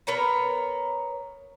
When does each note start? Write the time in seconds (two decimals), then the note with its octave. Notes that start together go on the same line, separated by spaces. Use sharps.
0.07 B3 A#4 C#5 A#5